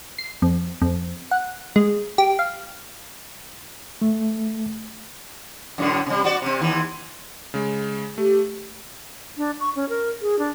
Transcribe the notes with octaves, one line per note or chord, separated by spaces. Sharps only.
C7
F2
F2
F#5
G#3
G4
F5
A3
F#2 A2 D3
C3 G3
C4 F#4 D5
C3 C4
D#2 E3
C#3 G#3
A3 G4
D4
C#6
C#4
A#4
G#4
D4